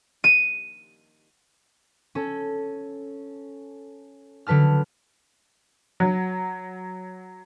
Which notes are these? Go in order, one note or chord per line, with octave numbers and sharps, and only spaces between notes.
D#7
C#4 A4
D3 F#3 B4 A5 F6
F#3